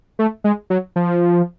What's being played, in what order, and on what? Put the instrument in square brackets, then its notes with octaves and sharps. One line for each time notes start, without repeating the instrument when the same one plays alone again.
[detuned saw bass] A3
G#3
F#3
F3